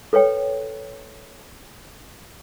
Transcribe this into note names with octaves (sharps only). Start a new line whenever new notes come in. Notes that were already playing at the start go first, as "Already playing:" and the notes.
A4 B4 C#5 G5